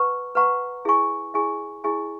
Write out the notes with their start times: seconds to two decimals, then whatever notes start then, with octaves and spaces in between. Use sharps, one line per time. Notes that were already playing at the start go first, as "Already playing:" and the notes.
Already playing: B4 F#5 A#5 C#6
0.35 B4 F#5 A#5 C#6
0.85 E4 G#4 D#5 G#5 C#6
1.34 E4 G#4 D#5 G#5 C#6
1.84 E4 G#4 D#5 G#5 C#6